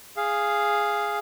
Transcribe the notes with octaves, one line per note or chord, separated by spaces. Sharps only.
G#4 F5